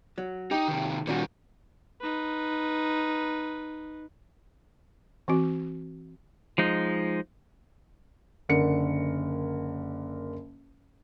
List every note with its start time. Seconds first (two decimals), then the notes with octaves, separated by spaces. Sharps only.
0.18 F#3
0.51 D#4 G4
0.68 C3 D#3
1.07 A#2 D#3 G3 C#4 F#4
2.01 D#4 B4
5.28 E3 C4 F#4
6.58 F3 G#3 D#4
8.49 F#1 D3 A#4 C#7